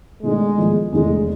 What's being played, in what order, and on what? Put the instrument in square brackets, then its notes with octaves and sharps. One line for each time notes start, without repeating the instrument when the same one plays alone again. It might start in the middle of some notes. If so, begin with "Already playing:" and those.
[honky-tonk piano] B2 A3 D4 [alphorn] G#3
[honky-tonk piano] A2 F3 B3
[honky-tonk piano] F1 E2 D3 A3 [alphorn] G#3